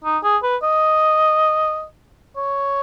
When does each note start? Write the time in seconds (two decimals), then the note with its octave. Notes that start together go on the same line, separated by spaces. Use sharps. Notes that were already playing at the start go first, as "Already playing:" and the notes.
0.04 D#4
0.24 G#4
0.43 B4
0.63 D#5
2.37 C#5